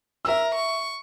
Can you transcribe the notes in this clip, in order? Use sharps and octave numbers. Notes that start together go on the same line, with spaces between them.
A#4 E5 E6
C#6